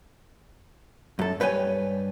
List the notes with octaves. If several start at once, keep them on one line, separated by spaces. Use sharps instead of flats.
F#2 A4
G2 B4 C#5 G5 G#5